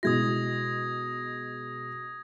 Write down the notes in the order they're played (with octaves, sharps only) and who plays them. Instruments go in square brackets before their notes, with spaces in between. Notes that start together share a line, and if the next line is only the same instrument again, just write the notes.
[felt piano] B2 G#3 E4 [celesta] F#4 [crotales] D#6 G#6 A#6